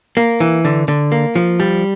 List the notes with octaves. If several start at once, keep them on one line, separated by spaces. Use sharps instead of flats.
A#3
E3
D3
D3
A#3
F3
G3